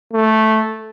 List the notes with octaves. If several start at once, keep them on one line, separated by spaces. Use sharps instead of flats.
A3